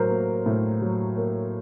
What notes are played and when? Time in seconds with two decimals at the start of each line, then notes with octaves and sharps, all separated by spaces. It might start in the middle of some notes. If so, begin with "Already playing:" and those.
Already playing: A2 F#3 A#4 C5
0.10 A#3
0.46 A2
0.82 F#3
1.17 A#3